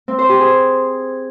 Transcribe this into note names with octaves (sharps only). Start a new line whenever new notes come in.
C4
C5
G4
G#4